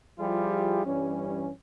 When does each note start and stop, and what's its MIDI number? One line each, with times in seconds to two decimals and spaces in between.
0.19 0.81 53
0.19 0.81 55
0.19 0.81 64
0.19 0.81 65
0.19 0.81 67
0.19 0.81 68
0.85 1.50 43
0.85 1.50 52
0.85 1.50 55
0.85 1.50 61